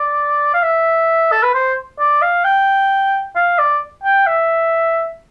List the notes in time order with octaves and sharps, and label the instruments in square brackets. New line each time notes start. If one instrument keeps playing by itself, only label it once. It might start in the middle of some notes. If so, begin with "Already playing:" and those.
Already playing: [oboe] D5
F5
E5
A4
B4
C5
D5
F5
G5
F5
D5
G5
E5